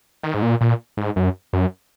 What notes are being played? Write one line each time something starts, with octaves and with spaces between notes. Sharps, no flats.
D#3
G#2
A#2
A#2
G#2
F#2
F#2